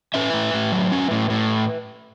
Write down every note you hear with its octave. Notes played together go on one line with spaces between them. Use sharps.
C#4 B4 E5
A2
A2
F#3
C#4
A2
A2